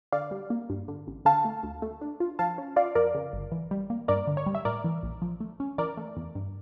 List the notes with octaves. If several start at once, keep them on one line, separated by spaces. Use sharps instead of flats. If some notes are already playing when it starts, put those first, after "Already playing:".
D3 D5 F5
G3
A#3
G2
D3
A1
D3 F5 A5
A3
D2
A3
D4
F4
F3 F5 A5
C#4
F4 D5 F5
F2 A#4 D5
C#3
G1
E3
G3
A#3
G2 A#4 D5
D3
C#5
G3
E5
A2 A#4 D5
E3
A#1
F3
A3
C#4
E3 A#4 D5
A3
E2
G2